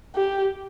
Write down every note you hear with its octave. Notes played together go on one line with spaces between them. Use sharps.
G4